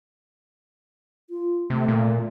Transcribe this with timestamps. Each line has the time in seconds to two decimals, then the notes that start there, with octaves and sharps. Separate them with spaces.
1.30 F4
1.70 C3 A3
1.88 A#2